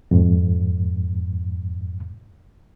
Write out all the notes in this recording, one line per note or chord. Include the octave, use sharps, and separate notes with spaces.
F2 G#2